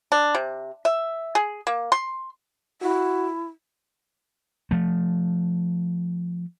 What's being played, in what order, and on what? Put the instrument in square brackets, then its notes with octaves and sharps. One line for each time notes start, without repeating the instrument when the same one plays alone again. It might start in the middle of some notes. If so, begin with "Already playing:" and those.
[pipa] D4
C3
E5
G#4
A#3
C6
[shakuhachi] E4 [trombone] F#4
[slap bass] F3 A3